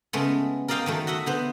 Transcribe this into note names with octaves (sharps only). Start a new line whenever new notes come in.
C#3 G#3 A3 B3
A#4 D5 D#5 F5 G5 C6
D#3 F#3 A3
F#4 D#5 E5 F#5
D3 B3 C5